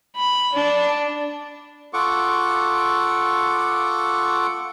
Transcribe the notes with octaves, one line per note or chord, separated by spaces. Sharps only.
B5
D4
F4 A4 F#5 C#6 D6